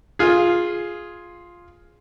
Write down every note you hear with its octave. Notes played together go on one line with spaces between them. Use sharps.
F4 G#4